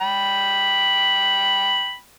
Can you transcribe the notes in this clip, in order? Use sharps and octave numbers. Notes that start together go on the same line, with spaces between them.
G5 B5